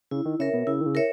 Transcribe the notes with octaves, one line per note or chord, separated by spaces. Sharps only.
C#3 E4
D#3
C#3 A#4 C#5 E5
B2
C#3 E4
D#3
C#3
A#4 C#5 E5